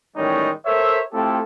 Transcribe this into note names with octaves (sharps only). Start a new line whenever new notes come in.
A1 D#3 G3 G#3 D#4 C#5
A4 A#4 C5 C#5 E5
A3 C4 E4 F4 G4 A4